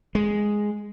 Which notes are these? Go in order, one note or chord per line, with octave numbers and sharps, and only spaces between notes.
G#3